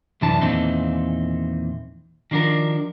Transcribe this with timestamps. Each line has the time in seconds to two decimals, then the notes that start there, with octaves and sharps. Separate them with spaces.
0.21 C2 F#2 E3 D4 A5
0.41 E2 A#2 D#3 E3 C4 D#4
2.31 D#3 F3 D4 F#4 A#4